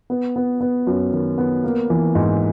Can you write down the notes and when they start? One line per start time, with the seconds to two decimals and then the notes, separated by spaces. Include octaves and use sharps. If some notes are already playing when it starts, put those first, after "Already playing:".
0.10 B3
0.36 B3
0.61 B3
0.87 F#2
1.13 D#3
1.38 B3
1.64 A#3
1.90 E3
2.15 G#2